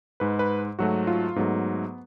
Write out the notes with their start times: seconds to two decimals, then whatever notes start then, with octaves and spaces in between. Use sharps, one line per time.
0.20 G#2 G#3 B4
0.39 B4
0.79 G#2 F#3 A3 F#4
1.07 F4
1.36 G#2 F#3 A3 B3